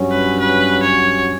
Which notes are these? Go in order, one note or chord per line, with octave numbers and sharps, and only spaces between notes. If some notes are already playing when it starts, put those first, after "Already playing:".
Already playing: G2 F#3 C#4
B4
B4
C#5